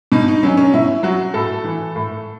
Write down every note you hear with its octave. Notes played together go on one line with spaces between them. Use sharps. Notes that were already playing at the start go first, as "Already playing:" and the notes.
B2 D#4
D#4
F#3 C#4
C#4
B2 E4
F#3 F#4
A2 A4
E3
A2